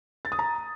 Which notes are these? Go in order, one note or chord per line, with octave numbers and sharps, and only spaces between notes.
A6
D#6
A#5